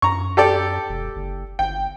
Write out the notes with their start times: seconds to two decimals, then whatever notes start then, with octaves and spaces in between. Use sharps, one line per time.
0.02 F#2 A#5 C#6
0.37 G4 A4 D5
0.89 E1
1.16 F#1
1.59 G1 G5